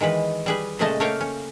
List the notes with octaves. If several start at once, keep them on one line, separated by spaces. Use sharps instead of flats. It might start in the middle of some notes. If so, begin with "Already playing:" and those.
D#3 E3 G#3 B4
G3 G#4 B4
A#2 C#3 G#3 A3 D#5 A5
A3 A#3 C#5 F5 G5
C#4